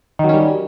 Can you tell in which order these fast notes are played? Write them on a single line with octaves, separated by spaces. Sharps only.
D#3 F#3 C#4 G3